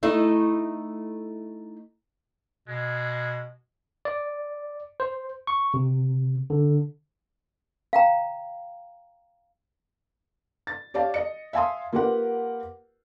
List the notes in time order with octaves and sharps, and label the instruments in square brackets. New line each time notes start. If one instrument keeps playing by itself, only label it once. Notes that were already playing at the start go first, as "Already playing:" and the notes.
[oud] A3 D#4 E4
[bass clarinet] B2 [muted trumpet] G#3
[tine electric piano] D5
C5
C#6
C3
D3
[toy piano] F5 G5 A#5
[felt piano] A6
G4 C#5 D5 F5 A5
D#5 C#7
E5 F5 G#5 A5 C6 D#6
A#3 F4 G4 A#4 B4 F#5